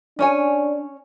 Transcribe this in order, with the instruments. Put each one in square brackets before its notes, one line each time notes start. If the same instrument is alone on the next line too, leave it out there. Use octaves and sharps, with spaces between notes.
[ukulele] C#4 C#5 G#5 [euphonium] D4